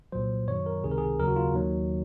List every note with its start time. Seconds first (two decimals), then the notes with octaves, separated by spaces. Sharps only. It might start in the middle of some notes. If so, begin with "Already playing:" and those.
0.12 C2 A#2 F#3 C5
0.47 F#2 D#3 F#3 C#5
0.66 A#4
0.83 C#2 C3 D#3 G#4
0.91 A#4
0.98 G#4
1.18 D#2 C#3 F#3 A#4
1.28 F#4
1.36 F4
1.54 D#2 D#3 F#3